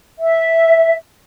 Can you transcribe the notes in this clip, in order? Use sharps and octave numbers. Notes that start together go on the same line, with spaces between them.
E5